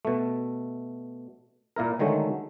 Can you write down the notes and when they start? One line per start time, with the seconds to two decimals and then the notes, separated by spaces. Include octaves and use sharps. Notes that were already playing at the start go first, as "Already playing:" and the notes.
0.05 B2 A3
1.76 A#2 A#3 E4 A#4
1.99 D3 D#3 F#3 G#3 A3